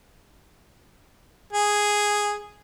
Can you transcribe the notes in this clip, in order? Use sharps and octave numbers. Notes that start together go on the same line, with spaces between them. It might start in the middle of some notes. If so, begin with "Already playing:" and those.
G#4